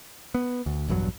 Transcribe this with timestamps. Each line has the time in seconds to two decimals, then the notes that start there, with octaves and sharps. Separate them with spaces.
0.35 B3
0.66 D2
0.88 A#1 E2 G2 F#3